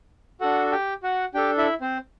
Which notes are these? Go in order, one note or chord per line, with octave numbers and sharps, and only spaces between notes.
D4 F#4 A4 F#5
G4 G5
F#4 F#5
D4 G4 A4 G5
E4 E5
C4 C5